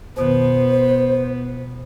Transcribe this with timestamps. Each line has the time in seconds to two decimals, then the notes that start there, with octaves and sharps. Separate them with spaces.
0.17 F2 B2 D#3 B3 C5